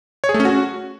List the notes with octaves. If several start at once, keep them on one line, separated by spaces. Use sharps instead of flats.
C#5
G#4
A3
C#4
F#4